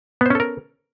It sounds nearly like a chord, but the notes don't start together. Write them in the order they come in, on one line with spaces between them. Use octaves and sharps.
B3 C5 C#4 A4 A#4